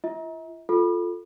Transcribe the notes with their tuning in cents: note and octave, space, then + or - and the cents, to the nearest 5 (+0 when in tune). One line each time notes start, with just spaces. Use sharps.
F4 -40 E5 -45
F4 +5 A4 +0